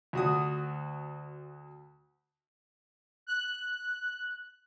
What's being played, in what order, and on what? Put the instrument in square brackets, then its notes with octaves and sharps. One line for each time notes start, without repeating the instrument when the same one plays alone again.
[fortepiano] D2 F#4 D#6
[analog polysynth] F#6